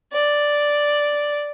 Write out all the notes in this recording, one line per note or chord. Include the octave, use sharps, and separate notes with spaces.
D5